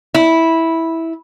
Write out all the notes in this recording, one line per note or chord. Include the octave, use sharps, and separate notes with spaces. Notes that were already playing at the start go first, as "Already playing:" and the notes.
E4